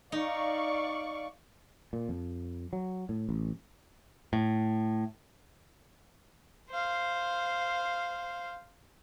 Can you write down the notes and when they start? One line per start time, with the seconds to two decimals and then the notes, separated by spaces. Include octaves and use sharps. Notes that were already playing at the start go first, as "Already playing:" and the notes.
0.12 D#4 D5 F5 C#6
1.93 A#2
2.09 F2
2.73 F#3
3.09 A2
3.29 A1
4.33 A2
6.71 C5 F5